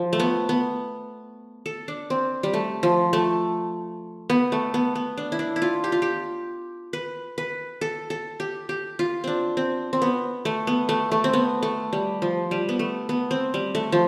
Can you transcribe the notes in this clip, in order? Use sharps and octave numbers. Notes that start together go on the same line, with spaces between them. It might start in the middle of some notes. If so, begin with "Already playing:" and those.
Already playing: F3
A3
B3
B3
A4
D4
C4
G3
A3
F3
A3
B3
A3
B3
B3
D4
E4
D4
E4
F4
G4
F4
G4
B4
B4
A4
A4
G4
G4
F4
C4 D4
C4
C4
B3
A3
B3
A3
A3
C4
B3
A3
G3
F3
G3
B3
A3
B3
C4
G3
A3
F3